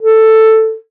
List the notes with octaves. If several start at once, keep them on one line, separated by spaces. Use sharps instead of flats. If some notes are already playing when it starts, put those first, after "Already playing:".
A4